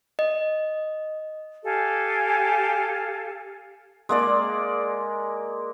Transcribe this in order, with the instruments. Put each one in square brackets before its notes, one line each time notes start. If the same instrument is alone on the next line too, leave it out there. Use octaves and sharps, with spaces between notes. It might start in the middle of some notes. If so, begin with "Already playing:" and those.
[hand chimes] D#5
[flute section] G4 A4 F5 G#5
[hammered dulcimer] G#3 A#3 D5